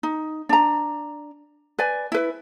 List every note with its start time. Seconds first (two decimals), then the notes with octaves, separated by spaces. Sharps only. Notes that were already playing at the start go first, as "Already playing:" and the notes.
0.03 D#4
0.49 D4 A#5
1.79 B4 D5 G#5
2.12 E4 B4